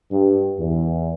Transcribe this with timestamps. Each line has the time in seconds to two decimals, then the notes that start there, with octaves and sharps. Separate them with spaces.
0.11 G2
0.59 E2